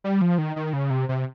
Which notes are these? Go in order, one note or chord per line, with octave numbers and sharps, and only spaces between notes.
G3
F3
D#3
D#3
C#3
C3
C3